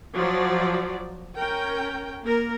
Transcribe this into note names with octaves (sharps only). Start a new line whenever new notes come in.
F3 F#3 D5
C#4 A#4 G5
A#3 A#4